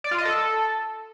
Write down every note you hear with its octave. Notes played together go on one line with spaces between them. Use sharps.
D5
F4
D#5
A4